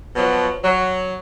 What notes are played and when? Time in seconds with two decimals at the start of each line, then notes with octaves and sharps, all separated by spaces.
0.16 B2 F3 F#3
0.64 F#3